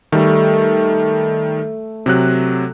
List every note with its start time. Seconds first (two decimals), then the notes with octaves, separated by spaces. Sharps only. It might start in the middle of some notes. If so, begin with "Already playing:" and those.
0.12 D#3 G3 A3
2.06 C3 F#3 F#6